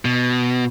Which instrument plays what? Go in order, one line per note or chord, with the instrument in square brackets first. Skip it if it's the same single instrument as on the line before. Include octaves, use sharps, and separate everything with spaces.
[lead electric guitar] B2